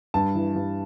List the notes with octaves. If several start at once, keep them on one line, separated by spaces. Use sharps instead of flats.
G2 A5
E3
G2